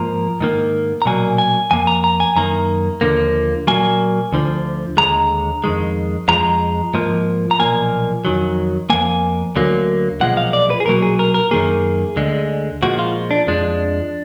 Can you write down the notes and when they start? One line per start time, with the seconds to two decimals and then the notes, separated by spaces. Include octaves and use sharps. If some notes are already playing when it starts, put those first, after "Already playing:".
Already playing: G#2 F3 A#3 A#5
0.40 G#2 D#3 A#3
1.02 A#5
1.06 B1 A#2 F#3 A#3 G#5
1.38 G#5
1.71 F2 F3 A#3 G#5
1.87 A#5
2.04 A#5
2.20 G#5
2.36 F#2 D#3 A#3 A#5
3.01 D#2 D3 F3 A#3
3.67 A#2 F#3 A#3 G#5
4.33 D2 D3 F3
4.97 D#2 D3 G#3 A#5
5.64 F2 D#3 G#3
6.28 F2 F3 G#3 A#5
6.94 G#2 F3 A#3
7.51 A#5
7.59 B1 A#2 F3 A#3 G#5
8.25 F2 D#3 F#3
8.90 F2 F3 A#3 G#5
9.56 D2 D3 F#3 A#3
10.20 B1 A#2 F3 G#3 F#5
10.37 F5
10.53 D5
10.70 B4
10.80 G#4
10.86 B1 A#2 F#3 A#3 A#4
11.03 G#4
11.19 A#4
11.34 A#4
11.51 F#2 D#3 A#3 G#4
12.16 D2 D3 G#3
12.83 A#2 F3 G#3 F#4
12.99 F4
13.31 D4
13.47 F2 F3 G#3 D4